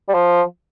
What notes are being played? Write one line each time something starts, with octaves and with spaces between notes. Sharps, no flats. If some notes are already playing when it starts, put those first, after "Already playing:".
G3
F3